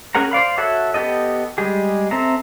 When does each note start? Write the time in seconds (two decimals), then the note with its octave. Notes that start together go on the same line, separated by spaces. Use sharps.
0.15 C#4 G#4 A#4 F#5 A#5
0.31 C5 D5 F5 B5
0.58 F#4 A4 C#5 E5 F#5
0.94 B3 G4 A4 D#5
1.58 G3 G#3 G4 G#4
2.11 C4 A4 E5 A#5